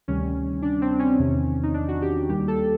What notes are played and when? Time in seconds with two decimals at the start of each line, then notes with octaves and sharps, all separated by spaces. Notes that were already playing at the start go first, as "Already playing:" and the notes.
0.08 D2 C3 D#3 G3 C#4
0.62 D4
0.82 C4
0.99 C#4
1.19 E2 C3 D#3
1.63 D#4
1.74 D4
1.88 F#4
2.02 G4
2.29 D#2 D#3 G3 G4
2.48 A4